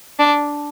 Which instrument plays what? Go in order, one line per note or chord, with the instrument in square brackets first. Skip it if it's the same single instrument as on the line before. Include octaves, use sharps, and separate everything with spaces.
[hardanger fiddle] D4